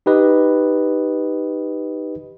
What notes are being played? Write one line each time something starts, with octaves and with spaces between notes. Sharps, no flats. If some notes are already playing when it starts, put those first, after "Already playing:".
D#4 G4 B4 D#5